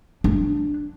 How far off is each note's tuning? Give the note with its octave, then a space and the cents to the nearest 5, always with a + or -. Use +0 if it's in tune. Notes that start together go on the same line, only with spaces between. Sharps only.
D4 +0